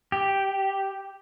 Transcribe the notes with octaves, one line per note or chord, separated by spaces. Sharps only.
G4